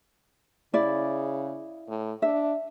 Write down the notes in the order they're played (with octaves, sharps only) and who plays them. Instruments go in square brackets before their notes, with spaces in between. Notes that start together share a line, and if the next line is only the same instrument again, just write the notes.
[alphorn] C#3 [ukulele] E4 D5
[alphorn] A2
[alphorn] D4 [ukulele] E5